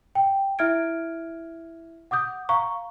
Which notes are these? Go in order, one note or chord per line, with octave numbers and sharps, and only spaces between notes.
G5
E4 E5 F6 G#6 D7
F#5 D6 D#6 G6
F5 A#5 C#6